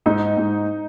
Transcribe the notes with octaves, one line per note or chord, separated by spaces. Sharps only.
G#2 D#4
G#2